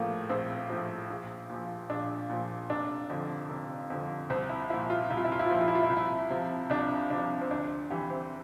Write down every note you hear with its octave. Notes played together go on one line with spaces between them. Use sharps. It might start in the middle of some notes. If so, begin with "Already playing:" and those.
Already playing: A#1 A2 F3 A3 A#3
A#1 C4
A2 F3
A#1
A#2 F3
A#1 D4
A#2 F3
F1 D4
F2 D3 F3
F1
F2 D3 F3
C2 C4
E4
A#2 F3 E4
F4
C2 E4
F4
E4
F4
E4
F4
A#2 F3 E4
F4
E4
F4
E4
C2 F4
E4
C3 F3
C2 D4
C3 F3 D4
C4
D2 D4
C3 E3 G4
C4